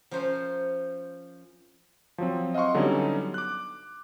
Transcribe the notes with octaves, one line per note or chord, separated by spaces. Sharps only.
F3 C#4 A#4 C5
F3 F#3 C4
D#5 F5 F#5 C6 C#6
D3 F#3 G3 B3 C#4 D#4
D6 F#6